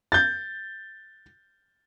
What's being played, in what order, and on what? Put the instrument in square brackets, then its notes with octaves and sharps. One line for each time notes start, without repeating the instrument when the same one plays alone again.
[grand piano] G6 A6